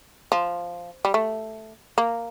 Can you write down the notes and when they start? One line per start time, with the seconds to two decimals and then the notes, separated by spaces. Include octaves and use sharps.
0.32 F3
1.05 G3
1.14 A3
1.98 A#3